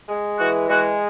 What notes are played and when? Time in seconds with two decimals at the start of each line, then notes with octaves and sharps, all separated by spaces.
0.09 G#3
0.39 E3 F#4
0.70 G#3 F#4